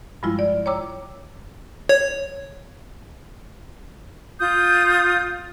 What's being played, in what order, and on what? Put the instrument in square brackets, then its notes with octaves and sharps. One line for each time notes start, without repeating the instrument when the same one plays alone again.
[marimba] G2 F3 G3 G#3 E4 F4
D5
C#5 G5 A#5 D6 E6
[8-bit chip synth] C#5
[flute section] F4 D#6 G6